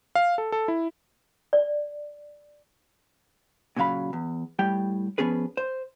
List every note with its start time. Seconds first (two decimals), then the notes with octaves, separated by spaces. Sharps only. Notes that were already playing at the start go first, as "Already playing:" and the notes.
0.15 F5
0.38 A4
0.52 A4
0.68 E4
1.53 D5
3.76 A#2 C#3 F#3 F5 B5
4.13 E2
4.59 A2 G3 G4 G5
5.18 F3 G3 B3 C#4 G#4 B4
5.57 C5